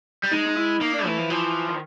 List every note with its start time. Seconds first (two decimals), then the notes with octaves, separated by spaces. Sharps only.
0.23 G3
0.32 G#3 D#4
0.46 D#4
0.57 E4
0.81 A#3 D#4
0.93 D4
1.05 E3 A3
1.18 F3
1.30 E3 F3
1.69 D#3